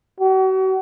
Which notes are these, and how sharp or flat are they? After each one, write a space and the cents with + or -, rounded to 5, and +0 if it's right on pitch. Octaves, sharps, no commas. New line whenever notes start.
F#4 +40